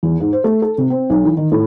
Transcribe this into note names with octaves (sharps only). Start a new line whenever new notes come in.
E2
G#2
C5
A3
A4
C3
C4
B1
E3
D#3
A2